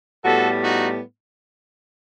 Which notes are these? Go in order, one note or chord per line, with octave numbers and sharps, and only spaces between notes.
A2 G3 B3 F#4 A4
D#4 F#4